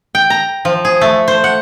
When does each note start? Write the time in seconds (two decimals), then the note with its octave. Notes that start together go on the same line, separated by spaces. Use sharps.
0.15 G5
0.30 A#5
0.65 F3
0.85 G#4
1.01 A3
1.28 C5
1.44 F#5